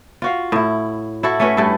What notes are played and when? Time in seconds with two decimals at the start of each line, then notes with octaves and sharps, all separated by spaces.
0.22 F4 F#4 F5
0.52 A2 E4
1.23 E4 F#4 A4
1.40 A3 C#4 F#4 B4
1.57 G2 A3 E4 A4